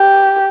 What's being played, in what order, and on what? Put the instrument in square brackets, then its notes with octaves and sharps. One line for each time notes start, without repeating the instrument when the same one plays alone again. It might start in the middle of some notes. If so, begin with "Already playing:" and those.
Already playing: [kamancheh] G4